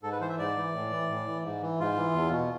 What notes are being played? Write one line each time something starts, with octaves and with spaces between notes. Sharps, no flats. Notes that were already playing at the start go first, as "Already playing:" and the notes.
G#2 A4
B4
E3 C5
E5
G#2 D5
E3
A2
E3
A2
E3
G#2
E3
G#2 F4
E3
E2
B2